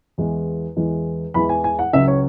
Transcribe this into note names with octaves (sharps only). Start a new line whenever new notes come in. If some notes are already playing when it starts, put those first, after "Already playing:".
E2 E3 G#3
E2 E3 G#3
E2 E3 G#3 B5
G#5
G#5
F#5
C#2 C#3 F#3 E5
C#5